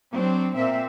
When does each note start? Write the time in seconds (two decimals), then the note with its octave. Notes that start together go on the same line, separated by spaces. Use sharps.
0.13 F#3 C4 D4
0.55 A#2 A#3 C4 E5